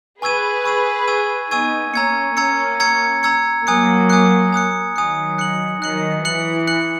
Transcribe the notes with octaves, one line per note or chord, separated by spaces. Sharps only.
G#4 B4 G#5 C#6 E6 G#6 D#7
G#5 C#6 E6 G#6 D#7
G#5 C#6 E6 G#6 D#7
B3 D#4 G#5 C#6 E6 G#6 D#7
A#3 C#4 A#5 E6 G#6 C#7
A#3 C#4 A#5 E6 G#6 C#7
A#5 E6 G#6 C#7
A#5 E6 G#6 C#7
F#3 A#3 G#5 D#6 F#6 C#7
G#5 D#6 F#6 C#7
G#5 D#6 F#6 C#7
D#3 F#3 G#5 D#6 F#6 C#7
F#6 C#7 F#7
D#3 F#3 F#6 C#7 F#7
E3 F#6 C#7 F#7
F#6 C#7 F#7